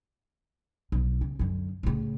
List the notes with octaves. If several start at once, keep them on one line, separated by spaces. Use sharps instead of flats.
B1 F#3
C#3
F#2 D3
A2 C#3